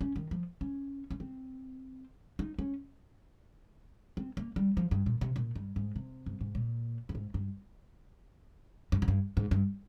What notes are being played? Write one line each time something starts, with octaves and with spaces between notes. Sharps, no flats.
C#4
D#3
F3
C#4
C#4
C4
D#4
C#4
C4
A#3
G3
F3
G2
A#2
C3
A#2
G2
G#2
C3
G2
G#2
A#2
G2
G#2
G2
G2
G#2
G2
G#2
G2